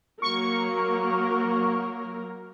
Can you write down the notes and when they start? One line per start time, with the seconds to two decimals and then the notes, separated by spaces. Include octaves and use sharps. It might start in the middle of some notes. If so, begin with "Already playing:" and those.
0.22 F#3 A#3 A#4 C#6